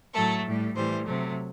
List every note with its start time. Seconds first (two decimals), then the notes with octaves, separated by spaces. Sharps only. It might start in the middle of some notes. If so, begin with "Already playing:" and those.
0.14 A2 F#3 A3 A4
0.45 A2 G3
0.75 A2 E3 G3 C5
1.06 C3 F#3 A3